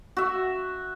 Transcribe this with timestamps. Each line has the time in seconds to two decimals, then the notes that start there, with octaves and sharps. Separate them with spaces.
0.17 F#4 E5